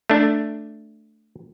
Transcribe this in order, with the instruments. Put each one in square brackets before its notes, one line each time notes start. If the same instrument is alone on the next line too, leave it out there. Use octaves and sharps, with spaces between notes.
[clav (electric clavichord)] A3 D4